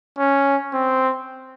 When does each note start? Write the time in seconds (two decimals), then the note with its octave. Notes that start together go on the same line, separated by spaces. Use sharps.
0.18 C#4
0.73 C4